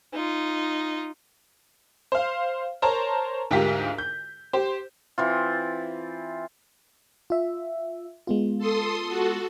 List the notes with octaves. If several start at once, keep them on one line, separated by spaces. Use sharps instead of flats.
D#4 F4
C5 F5
A#4 C5 C#5 A5 A#5
D2 G#2 F4 G4 A#4 B6
G6
G4 C5
E3 C4 F4
F4 E5
G#3 B3 F4
A4 C6 D#6
F#4 A4